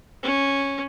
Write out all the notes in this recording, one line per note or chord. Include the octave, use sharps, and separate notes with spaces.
C#4